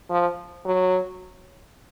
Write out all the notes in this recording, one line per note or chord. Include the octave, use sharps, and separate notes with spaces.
F3
F#3